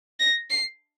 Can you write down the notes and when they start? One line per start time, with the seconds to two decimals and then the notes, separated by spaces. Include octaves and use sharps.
0.20 A#6
0.51 C7